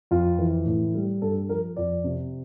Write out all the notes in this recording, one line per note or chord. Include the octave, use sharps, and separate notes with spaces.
F2 F4
E3
A2
G3
G2 A4
F3 A#4
F2 D5
C3